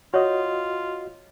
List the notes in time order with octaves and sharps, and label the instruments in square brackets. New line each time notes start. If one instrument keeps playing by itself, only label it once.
[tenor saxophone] F4 [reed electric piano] F#4 D#5 [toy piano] C#5